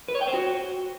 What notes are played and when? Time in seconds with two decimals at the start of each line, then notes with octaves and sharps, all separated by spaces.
0.08 B4
0.15 C#5
0.21 G5
0.27 C5
0.34 F#4